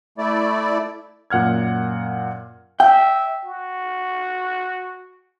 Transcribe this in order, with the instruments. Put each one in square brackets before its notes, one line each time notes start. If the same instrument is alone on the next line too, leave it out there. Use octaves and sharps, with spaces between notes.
[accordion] A3 E4 D5
[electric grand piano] F#2 A#2 F#5 F6 G#6
[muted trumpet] E5 [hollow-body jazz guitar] G5
[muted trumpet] F#4